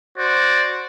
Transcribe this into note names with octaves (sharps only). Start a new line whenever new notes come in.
F#4 C5 D5